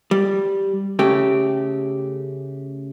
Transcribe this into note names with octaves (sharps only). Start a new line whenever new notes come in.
G3
C#3 A3 G4